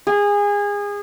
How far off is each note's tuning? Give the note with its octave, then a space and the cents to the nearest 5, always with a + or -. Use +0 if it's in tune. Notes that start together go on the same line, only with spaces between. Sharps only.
G#4 -25